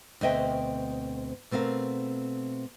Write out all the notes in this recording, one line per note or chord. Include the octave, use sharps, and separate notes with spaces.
D2 B2 C4 D#5 E5 G5
B2 A3 C4 A#4 F5